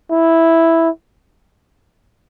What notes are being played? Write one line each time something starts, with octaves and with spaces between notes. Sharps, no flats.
E4